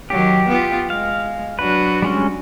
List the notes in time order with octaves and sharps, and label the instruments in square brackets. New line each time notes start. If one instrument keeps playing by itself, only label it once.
[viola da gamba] D#3 F#3 [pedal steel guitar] G4
[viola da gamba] B3 F4
[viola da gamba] G#3 [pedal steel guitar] F5
[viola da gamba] F#3 D4 F#4 [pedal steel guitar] B4
[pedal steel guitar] G3 G#3 C#4